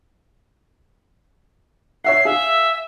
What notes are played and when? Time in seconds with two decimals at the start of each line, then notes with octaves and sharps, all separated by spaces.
2.04 C#5 E5 F#5 C7
2.25 G#4 E5 F5